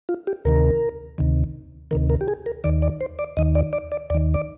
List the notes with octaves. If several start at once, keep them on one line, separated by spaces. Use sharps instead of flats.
F4
G4
D2 C3 D#3 A#4
D2 C3 D#3
D2 C3 D#3 A#4
A#4
G4
G#4
A#4
D#2 D#3 D5
D5
C5
D5
D#2 D#3 D#5
D5
D5
D5
D#2 D#3 D5
D5